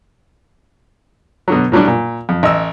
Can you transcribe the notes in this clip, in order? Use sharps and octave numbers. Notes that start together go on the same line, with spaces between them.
B2 D3 F#3
A2 F#3 G3 D4
A#2
F2
A1 D#5 E6